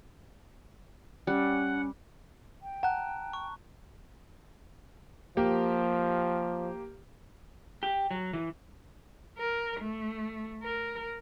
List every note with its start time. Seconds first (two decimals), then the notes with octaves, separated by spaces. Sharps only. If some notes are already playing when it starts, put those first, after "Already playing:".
1.27 G3 C#4 F#5
2.62 G5
2.83 F#5 A5 A#5 F#6
3.33 C#6
5.37 F3 A#3 G4
7.83 G4
8.11 F#3
8.33 E3
9.38 A#4
9.80 A3
10.63 A#4